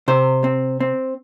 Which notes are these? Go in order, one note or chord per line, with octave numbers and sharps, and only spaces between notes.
C3 C5
C4
C4